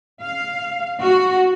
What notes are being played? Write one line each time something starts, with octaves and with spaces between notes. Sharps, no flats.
F5
F#4